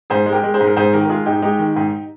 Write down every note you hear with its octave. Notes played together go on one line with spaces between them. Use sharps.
G#2 G#4 C5
G#3
G4 A#4
G#3
G#4 C5
G#2
A#4
G#2 G#4 C5
D#3 G4 A#4
A#4
G#3 F4 G#4
G#2 D#4 G4
G#3 D#4 G4
D#3
G#2